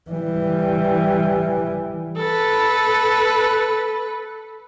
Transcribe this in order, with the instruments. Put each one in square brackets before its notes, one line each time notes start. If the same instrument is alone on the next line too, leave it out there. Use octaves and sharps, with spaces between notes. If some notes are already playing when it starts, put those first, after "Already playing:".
[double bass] E3 G3
[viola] A4 B4